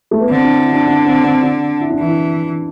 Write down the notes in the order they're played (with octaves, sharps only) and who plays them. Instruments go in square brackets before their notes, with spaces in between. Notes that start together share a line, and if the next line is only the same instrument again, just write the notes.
[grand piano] A3
B3
[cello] D3 [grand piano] C4
[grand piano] D4
E4
D4
D4
C4
C4
D4
E4
D4
[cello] E3 [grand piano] E4